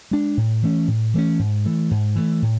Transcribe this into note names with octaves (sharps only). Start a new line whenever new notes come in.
G#3 D4
A2
E3 A3 C#4
A2
E3 A3 C#4
G#2
E3 A3
G#2
E3 A3
A2